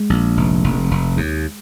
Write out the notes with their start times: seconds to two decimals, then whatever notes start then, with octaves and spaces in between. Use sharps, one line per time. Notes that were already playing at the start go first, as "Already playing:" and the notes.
Already playing: G#3
0.10 A#1
0.37 F1
0.64 F1
0.91 F1
1.17 D#2